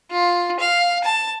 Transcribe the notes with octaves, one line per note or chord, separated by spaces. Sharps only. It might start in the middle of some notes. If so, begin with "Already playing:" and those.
F4
F5
A5